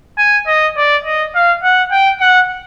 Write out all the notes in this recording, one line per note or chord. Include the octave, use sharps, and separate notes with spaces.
G#5
D#5
D5
D#5
F5
F#5
G5
F#5